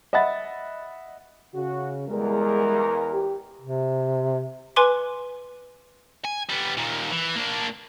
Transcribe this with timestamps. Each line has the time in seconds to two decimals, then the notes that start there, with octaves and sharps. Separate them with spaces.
0.13 D#5 E5 F#5 B5 A6
1.55 C#3 F#4
2.09 E2 G3 G#3 A#4
3.13 G4
3.61 C3
4.76 B4 G#5 C6 D6
6.25 G#5
6.50 G3 B3
6.78 D#2 A#2
7.11 E3
7.36 A#3 D4